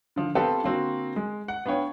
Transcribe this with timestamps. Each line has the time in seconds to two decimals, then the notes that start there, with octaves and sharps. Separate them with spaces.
0.16 D3 F3
0.35 B3 C4 F4 G4 A4
0.63 D3 A#3 C4 F#4
1.16 G#3
1.48 F#5
1.66 B3 D4 F4 C#5 G5